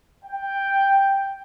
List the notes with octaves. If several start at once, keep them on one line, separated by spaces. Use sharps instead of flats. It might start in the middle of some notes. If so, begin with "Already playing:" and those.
G5